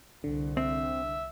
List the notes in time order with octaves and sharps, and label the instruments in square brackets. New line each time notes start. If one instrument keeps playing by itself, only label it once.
[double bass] C2 [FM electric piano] D3
[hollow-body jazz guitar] C4 [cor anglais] E5